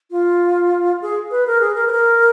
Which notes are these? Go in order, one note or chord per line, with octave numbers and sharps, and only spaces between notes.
F4
G#4
B4
A#4
G#4
A#4
B4
A#4